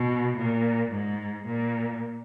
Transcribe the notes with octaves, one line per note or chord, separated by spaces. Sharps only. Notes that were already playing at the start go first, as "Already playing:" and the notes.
Already playing: B2
A#2
G#2
A#2